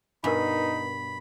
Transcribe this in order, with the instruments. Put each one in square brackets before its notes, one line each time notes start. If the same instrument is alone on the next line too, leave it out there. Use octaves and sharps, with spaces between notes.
[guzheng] G2 B2 [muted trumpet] D#4 [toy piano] A#4 F#5 G#5 [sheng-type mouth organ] B5